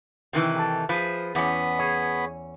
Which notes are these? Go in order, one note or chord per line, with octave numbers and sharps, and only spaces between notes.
C3 D#3 E3
G4 A4
F3 G#4 B4
E2 B3 C#4 B5
G#4 C#5